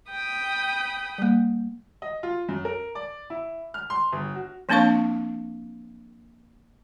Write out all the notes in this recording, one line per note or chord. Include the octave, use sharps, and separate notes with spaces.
G5 B5 D#6
G3 A#3
D#5
F4
F#2
A#4
D5
E4
F6
C6
G1
F#4
F3 A#3 C4 D4 F5 C#6